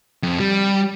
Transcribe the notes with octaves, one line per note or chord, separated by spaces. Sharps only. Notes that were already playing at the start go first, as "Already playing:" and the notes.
F2
G3